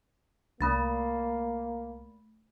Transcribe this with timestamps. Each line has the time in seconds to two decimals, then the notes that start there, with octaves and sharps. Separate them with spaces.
0.61 C2 A3 A#3 B5 A6